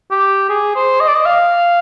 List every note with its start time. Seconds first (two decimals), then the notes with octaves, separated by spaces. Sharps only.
0.11 G4
0.49 G#4
0.76 C5
1.01 D#5
1.08 D5
1.15 D#5
1.26 F5